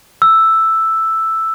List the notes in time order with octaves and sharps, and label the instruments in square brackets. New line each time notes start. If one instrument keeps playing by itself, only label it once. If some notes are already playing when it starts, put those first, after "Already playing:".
[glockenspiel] E6